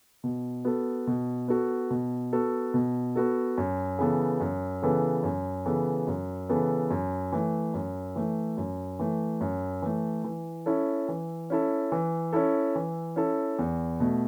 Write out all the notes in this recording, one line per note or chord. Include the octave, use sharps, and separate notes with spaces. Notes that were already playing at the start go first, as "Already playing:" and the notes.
B2
B3 F#4 A4
B2
B3 F#4 A4
B2
B3 F#4 A4
B2
B3 F#4 A4
F#2
C#3 E3 B3 A4
F#2
C#3 E3 B3 A4
F#2
C#3 E3 B3 A4
F#2
C#3 E3 B3 A4
F#2
E3 A3
F#2
E3 A3
F#2
E3 A3
F#2
E3 A3
E3
C#4 E4 A4
E3
C#4 E4 A4
E3
C#4 E4 A4
E3
C#4 E4 A4
E2
B2 A3